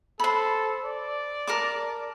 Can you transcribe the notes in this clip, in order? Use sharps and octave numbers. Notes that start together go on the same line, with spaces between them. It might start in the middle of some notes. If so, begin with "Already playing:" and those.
A4 C5 B5
D5
A#4 A5 D6